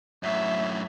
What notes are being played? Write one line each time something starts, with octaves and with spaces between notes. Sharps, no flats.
F#2 A2 E5